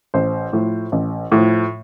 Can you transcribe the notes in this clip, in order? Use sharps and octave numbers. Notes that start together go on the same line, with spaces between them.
A1 C5
A2 F3
A1
A2 F3